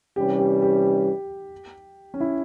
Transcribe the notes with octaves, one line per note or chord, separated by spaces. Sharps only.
C3 E3 G3 C#4 G4
G4
G4
C#4
E4